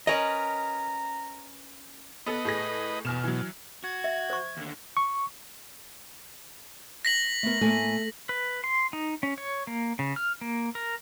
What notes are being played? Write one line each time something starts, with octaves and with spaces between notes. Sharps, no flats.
C#4 A#4 B4 D#5 A#5
B3 A4 B4 D#5
A2 G#4 A#6
E2 B2 F6 E7
E3 F#3
F#4 G#6
E5
C5 C#6
D#2 D3
C#6
A#6 B6 F#7
A3 B3 A#4
A2 A3 A#3 G#5
B4
C6
D#4
C#4
C#5
A#3
C#3
F6
A#3
A#4